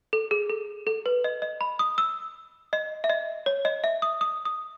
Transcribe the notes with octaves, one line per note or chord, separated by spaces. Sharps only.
A4
G#4
A4
A4
B4
D#5
D#5
B5
D#6
E6
D#5
E5
D#5
C#5
D#5
E5
D#6
D#6
D#6